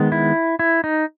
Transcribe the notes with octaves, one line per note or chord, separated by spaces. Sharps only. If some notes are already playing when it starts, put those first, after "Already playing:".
Already playing: D#3 G#3 B3
E4
E4
D#4